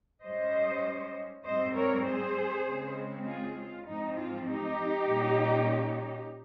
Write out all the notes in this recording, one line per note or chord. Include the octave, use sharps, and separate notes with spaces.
G#2 G3 C#4 C5 D#5
G#2 G3 C4 C5 D#5
A#4 C#5
G#4 C5
C#3 G#3 C4
F4 G#4
F4
G#2 F3 C4 D#4
F4
D#4 G4
A#2 G3 C#4